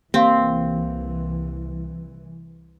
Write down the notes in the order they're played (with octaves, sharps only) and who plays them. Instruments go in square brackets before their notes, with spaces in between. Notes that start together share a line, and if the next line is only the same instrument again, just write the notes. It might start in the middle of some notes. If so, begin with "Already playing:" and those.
[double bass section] C2 E3 [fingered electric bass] A#3 [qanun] C4 [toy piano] G4 F5